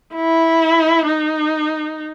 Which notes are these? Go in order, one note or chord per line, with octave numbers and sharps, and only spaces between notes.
E4
D#4